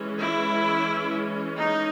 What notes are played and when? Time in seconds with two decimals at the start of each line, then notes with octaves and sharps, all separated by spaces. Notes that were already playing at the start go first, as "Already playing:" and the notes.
Already playing: E3 G#3 C#4
0.20 E4
1.56 D#4